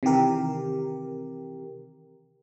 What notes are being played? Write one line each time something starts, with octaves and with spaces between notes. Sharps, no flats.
C3 D#3 E3 G4 A#4